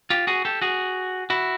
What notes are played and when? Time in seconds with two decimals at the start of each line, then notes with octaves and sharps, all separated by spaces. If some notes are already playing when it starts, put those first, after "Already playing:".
0.10 F4 G4
0.27 F#4 G#4
0.45 G4 A4
0.61 F#4 G#4
1.30 E4 F#4